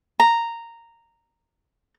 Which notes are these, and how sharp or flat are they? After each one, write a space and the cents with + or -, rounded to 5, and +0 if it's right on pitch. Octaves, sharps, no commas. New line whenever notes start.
A#5 -10